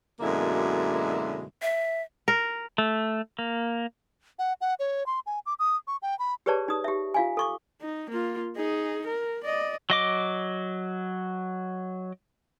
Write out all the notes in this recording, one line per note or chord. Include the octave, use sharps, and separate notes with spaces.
F#2 B2 D3 G#3 A#3 E4
E5
A#4
A3
A#3
F#5
F#5
C#5
C6
G#5
D6
D#6
C#6
G5
B5
G4 G#4 B4 C#5 D5 A5
D#4 D#6
G4 E5
F4 F5 G#5
A4 C#6 D6
D#4
A#3 F4
D#4 G#4
A#4
D5 D#5
F#3 D#5 D6